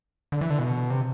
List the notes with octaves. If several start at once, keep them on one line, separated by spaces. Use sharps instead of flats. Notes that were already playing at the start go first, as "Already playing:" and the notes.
D3
E3
D3
B2
C3